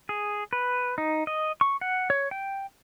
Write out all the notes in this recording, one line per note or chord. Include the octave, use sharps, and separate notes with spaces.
G#4
B4
D#4
D#5
C#6
F#5
C#5
G5